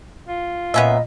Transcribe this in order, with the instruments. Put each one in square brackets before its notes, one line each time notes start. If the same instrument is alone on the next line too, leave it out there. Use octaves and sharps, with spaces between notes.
[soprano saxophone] F4
[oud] A#2 [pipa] B3 C#4 E5 [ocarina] D#5